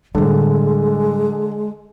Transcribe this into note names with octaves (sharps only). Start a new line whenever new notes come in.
A2 D3 G3 G#3